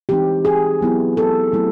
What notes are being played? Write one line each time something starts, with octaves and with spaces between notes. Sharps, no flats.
E3 G#3 C4 D#4 G4
G#4
F#3 B3 E4
A4
F#3 A3 C4 E4